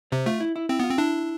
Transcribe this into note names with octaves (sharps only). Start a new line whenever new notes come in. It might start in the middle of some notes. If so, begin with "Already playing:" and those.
C3 C4
A3 F4
E4
E4
C4 E4
B3 F4
C4
D4 E4